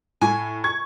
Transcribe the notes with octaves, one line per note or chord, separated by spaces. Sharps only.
A2 G#5
C#6 G#6